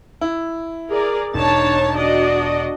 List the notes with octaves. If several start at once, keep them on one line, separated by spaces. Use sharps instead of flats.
E4
G#4 A#4 D5
E1 D4 D#4 C#5 A5
D4 F#4 D5 D#5